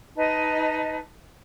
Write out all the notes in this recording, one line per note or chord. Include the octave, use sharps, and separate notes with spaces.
D#4 B4 D#5 A5